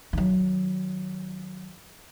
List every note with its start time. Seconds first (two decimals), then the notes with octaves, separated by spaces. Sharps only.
0.13 D#3 F#3